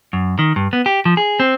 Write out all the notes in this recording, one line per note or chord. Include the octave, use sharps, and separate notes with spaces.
F#2
D#3
G2
B3
G4
F3
G#4
C4